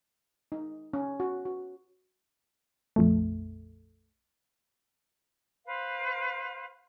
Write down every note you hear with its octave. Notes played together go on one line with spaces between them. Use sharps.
D#4
C#4
F#4
F#4
A#1 F2 A3
B4 C5 F5